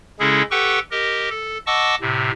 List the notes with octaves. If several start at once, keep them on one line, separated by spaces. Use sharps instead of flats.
C#3 G#3 C#4 E4 G#4 A4
G4 A4 B4 F#5 G5 C#6
G4 A#4 D#5
A4
D#5 F#5 A5 C#6 D6 E6
A2 C3